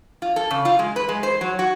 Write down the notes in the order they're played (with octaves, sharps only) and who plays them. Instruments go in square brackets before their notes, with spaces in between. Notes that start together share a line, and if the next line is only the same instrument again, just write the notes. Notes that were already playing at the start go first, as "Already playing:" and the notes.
[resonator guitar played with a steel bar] F4
A4
C#3
F4
G#3
B4
G#3
C5
F#3
F#4